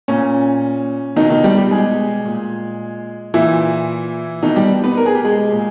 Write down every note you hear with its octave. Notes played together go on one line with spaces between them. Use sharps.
A#2 C#4
B2 D#3 D#4
D#3 D#4
G3 G4
G3 G4
G#3 G#4
A#2
A#2 E3 E4
B2 D#3 D#4
G3 G4
B3 B4
A#4
G#4
G4
G#3 G#4
A#2